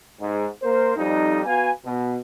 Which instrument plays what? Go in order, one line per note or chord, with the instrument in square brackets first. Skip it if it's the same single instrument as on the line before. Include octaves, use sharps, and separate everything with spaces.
[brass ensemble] G#2
A#3 A#4 C5
F2 G3 D#4
B3 F#4 B4 F5 G#5
B2